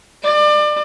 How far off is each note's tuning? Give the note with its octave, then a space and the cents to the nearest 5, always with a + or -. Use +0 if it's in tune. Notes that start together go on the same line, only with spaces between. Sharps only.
D5 +30